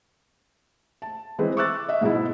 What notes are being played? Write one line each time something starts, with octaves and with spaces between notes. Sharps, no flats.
A5
E3 G#3 C4 B4
C#6 D6 E6 F#6 A6
D#5 E5
G#2 B2 G#3 E4